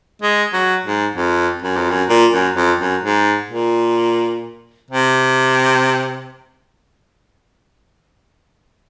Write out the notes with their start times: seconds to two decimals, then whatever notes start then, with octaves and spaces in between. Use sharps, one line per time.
0.22 G#3
0.53 F#3
0.85 G#2
1.15 F2
1.63 F#2
1.76 F2
1.90 F#2
2.09 A#2
2.32 F#2
2.56 F2
2.80 F#2
3.03 G#2
3.50 A#2
4.91 C3